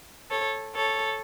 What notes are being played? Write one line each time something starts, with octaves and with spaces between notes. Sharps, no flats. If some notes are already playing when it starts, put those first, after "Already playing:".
A4 C#5
A4 C#5